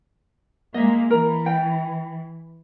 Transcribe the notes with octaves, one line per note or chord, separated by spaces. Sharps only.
G#3 A#3 D#5 E5
E3 A#4
G5